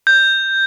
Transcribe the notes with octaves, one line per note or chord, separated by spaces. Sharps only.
G6